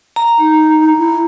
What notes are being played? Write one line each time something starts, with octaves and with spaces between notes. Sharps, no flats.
A#5
D#4
E4